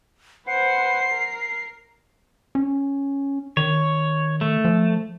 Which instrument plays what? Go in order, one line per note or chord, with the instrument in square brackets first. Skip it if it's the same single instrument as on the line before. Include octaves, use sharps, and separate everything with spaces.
[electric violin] B4 C5 [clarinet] F#5 [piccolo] C7
[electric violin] A#4
[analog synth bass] C#4
[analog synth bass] D#3 [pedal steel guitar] C#5
[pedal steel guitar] A3
[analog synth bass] F3